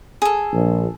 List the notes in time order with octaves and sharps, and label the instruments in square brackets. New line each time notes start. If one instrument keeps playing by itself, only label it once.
[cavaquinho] G#4 A4
[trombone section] A#1